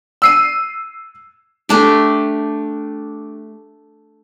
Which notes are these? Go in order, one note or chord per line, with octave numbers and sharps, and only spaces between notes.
E6 C7 D#7
A3 D4 G4